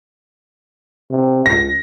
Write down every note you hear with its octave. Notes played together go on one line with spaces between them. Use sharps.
C3
C#2 A#6